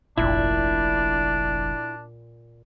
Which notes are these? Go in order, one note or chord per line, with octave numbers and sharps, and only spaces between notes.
F1 A#1 A#2 D4 E4